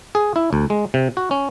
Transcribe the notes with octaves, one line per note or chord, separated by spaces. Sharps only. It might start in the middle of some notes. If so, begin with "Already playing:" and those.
G#4
E4
D2
G#3
C3
F#4
C#4